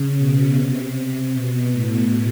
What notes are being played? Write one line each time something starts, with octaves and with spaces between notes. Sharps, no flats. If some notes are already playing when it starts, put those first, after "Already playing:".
Already playing: C#3
B2
C3
B2
A2